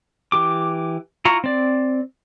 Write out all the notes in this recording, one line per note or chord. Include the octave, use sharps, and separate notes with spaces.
E3 G4 D6
E4 F4 A#5 C#6
C4 D5